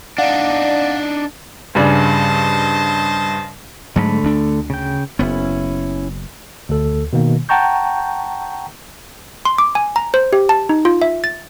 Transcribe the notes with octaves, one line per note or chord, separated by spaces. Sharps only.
D4 D#4 D5 F5 F#5
G2 C#3 C5 D5 D#5 A5
G#2 D3 F#3 G#3 A3 B5
D2 D4
C#3 G5
F#1 B3 C#4 E4
D2 A4
B2 D#3 A#3
F#5 G5 A5 A#5 C#6 G6
C6
D6
G#5
A#5
C5
G4
A5
D#4
F4
E5
A6